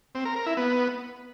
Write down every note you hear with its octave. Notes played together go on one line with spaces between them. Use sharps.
C4
A#4
A#4
E4
B3